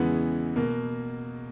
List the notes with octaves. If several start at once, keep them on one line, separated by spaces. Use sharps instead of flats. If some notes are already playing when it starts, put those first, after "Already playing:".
Already playing: E2 C#3 E3 G#3 B3 F#5
B2 A#3